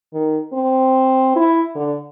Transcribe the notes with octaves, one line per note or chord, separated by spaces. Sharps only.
D#3
C4
E4
D3